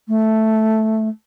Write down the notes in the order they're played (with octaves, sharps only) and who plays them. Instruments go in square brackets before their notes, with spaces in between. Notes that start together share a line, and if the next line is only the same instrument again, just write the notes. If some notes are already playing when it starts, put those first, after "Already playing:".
[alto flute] A3